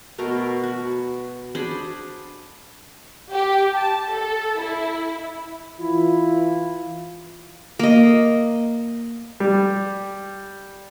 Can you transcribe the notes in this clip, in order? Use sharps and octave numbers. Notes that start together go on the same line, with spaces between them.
B2 A3 A#4
F#4
D4 G#4 C5 B5
G4
A5
A4
E4
E3 E4 F4
A#3 D#5
G3